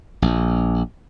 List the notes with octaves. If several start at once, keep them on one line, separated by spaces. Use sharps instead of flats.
A#1